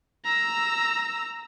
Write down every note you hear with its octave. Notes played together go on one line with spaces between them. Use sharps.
A#5 E6